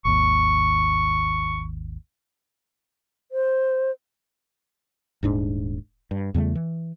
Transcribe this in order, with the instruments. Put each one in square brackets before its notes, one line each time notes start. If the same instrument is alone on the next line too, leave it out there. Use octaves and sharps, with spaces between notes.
[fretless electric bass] G#1 D#2 [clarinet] C#6
[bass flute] C5
[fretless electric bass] D#1 G#2 D4
G2
E2 C#3 G3 A3
E3